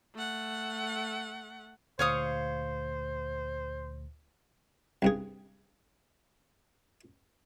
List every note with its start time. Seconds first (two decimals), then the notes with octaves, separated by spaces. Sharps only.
0.14 A3 F#5
1.99 D2 A#2 C5 C#5 F5 D#6 C#7
5.02 C2 G2 G#4